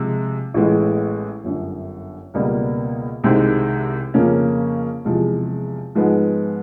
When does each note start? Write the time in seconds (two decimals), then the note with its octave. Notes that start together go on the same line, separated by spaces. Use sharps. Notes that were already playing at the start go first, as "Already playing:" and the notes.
Already playing: C3 F3 G#3
0.54 A1 A2 E3 G#3 B3
1.44 G1 F#2 D3
2.34 C#2 B2 G3 A#3
3.24 C2 C3 D#3 G#3 C4
4.14 F2 C#3 F3 A#3 C#4
5.04 E2 C3 F3 G#3
5.95 G#2 F3 G#3 B3